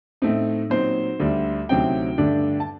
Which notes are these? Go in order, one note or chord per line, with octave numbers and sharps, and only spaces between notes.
A2 A3 C4 D#4
A#2 F#3 C4 D#4 C5
D2 D3 G3
D2 C3 F#3 C4 D#4 G5
G2 D3 A3 D4
A5